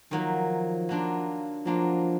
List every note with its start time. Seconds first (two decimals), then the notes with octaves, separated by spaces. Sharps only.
0.11 D#3 F3 F#3 A#3
0.89 F#3 A#3 D4 F4
1.65 F3 F#3 A#3 D4 F4